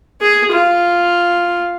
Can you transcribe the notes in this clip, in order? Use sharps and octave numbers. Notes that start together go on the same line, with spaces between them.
G#4
F4